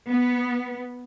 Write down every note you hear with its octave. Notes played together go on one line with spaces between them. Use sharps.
B3